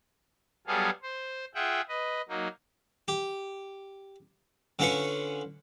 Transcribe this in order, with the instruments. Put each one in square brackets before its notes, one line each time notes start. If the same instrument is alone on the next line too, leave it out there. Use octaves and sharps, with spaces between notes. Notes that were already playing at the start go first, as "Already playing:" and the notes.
[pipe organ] F#3 G3 B3 G#4 A4 F5
C5
F4 G#4 E5 F#5 G5
B4 D#5
F#3 A#3 D#4
[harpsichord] G4
D3 C#4 F4 B4 C#6